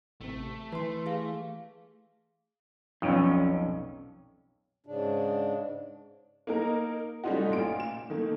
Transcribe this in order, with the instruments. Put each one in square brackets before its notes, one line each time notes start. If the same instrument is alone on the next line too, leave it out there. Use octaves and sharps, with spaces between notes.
[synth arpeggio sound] A1 C3 [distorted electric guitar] A3
[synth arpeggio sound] E3 [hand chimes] B4 C6
[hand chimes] G4 G#4 F5
[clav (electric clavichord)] B1 F2 [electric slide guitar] C#4 D#4
[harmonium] G#2 C#3 D4
[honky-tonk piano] A#3 D#4 A#4
G3 A3 C#4 D#4 F4 F#4
A1 A#2 F4 D7
E7
D#3 A3 A#3